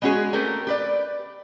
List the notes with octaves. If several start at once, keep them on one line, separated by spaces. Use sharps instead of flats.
G#3 B3 C#4 F#4 G#4
A3 A#3 C4 G4 A#4
G4 B4 D5